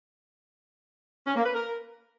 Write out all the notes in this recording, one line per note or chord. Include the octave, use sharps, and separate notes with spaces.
C#4
A#3
B4
A#4